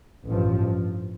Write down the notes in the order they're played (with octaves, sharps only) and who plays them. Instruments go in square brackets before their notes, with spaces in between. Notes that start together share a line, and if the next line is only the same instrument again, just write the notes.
[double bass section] A1 G2 F3